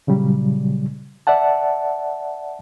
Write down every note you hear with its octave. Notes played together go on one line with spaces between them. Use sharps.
A#2 C#3 F#3 G3
D5 E5 F#5 A5